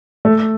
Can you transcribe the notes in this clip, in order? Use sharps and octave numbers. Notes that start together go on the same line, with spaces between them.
A3